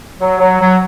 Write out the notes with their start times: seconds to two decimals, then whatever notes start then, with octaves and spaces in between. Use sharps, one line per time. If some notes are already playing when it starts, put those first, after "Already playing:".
0.20 F#3
0.40 F#3
0.61 F#3